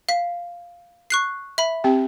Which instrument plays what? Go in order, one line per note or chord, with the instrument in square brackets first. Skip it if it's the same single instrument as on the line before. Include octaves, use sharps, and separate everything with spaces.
[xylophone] F5 B6
C#6 F#6 C7
E5 B5
[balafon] C4 G4 G5